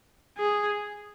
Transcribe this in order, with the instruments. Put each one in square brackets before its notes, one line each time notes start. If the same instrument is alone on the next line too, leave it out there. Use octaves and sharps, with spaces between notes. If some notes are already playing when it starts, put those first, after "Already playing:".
[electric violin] G#4